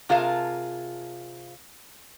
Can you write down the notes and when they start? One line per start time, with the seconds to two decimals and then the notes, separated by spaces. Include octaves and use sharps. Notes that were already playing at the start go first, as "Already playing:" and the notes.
0.09 C3 F4 G#4 A#4 F5 A5